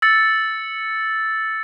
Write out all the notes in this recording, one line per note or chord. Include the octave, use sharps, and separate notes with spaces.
E6 A6 C#7